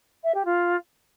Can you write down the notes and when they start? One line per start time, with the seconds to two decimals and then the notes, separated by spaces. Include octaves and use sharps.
0.23 E5
0.34 G4
0.45 F4